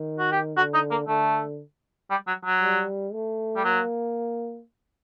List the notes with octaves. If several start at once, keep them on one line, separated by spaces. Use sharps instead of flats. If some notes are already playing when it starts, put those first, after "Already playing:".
Already playing: D#3
F#4
G4
D3 F#4
D#4
A#3
D3 A3
G3
F#3
F#3
G3
A3
G3
F#3 A#3